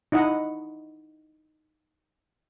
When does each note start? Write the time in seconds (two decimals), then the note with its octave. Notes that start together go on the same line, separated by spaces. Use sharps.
0.12 D#4 E4 D#5 F#5